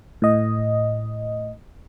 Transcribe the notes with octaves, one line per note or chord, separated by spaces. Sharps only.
A2 D#5